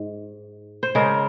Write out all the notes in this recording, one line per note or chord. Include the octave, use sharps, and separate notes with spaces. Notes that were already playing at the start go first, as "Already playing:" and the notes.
Already playing: G#2
C5
C#3 G#3 A#4